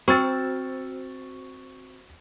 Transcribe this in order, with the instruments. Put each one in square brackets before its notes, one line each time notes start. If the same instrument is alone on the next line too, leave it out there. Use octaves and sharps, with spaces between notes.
[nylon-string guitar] C4 [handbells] F#4 C5 F6 [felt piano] C#6 E6 A6